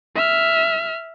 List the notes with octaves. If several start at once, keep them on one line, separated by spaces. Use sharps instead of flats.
E5 F6